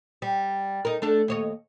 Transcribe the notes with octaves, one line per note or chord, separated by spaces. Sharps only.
G3
D#4 A#4
A3 D4 A4
D#2 C#5 D#5